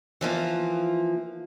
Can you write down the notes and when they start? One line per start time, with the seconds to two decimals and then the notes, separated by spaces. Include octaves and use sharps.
0.21 E3 F3 A#3